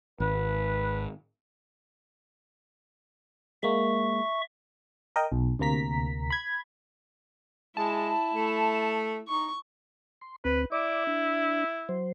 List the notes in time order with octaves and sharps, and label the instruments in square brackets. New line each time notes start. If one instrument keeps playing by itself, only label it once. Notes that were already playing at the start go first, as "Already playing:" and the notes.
[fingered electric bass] G#1 [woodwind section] B4
[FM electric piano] G#3 A#3 [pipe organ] E5 C#6
[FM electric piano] A#4 D#5 G5
B1
D2 C3 A#3 A#5 B6
B5 G#6
[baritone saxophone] G#3 [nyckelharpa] E4 [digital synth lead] A5
[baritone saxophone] A3
[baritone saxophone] D#4 [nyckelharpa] C#6
[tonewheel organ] C6
[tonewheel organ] D2 C4 [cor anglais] B4
[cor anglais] E4 [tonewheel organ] D5 D6
[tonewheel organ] D4
F#3 C5